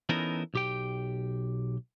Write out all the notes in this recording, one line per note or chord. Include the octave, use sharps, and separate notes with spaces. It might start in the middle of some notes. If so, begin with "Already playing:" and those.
E3 B3 C#4 D#4 A4 A#4
B1 G4 G5